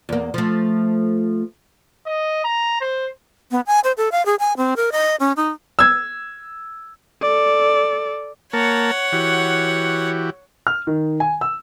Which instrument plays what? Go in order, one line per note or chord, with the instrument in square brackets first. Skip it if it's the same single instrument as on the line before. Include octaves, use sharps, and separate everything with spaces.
[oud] E2 A#3
F3 A3
[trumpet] D#5
A#5
C5
[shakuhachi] B3
G#5
C5
A4
F5
G#4
G#5
C4
A#4
D#5
C#4
D#4
[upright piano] E6 G#6
[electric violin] A4 D5
[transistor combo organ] A#3 A#4 A5 [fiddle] C#5 F#5
[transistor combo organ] E3 F#4 G4
[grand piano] F6
D#3
G#5
E6